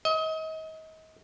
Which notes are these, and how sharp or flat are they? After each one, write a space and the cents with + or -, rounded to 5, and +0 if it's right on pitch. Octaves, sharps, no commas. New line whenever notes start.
D#5 +35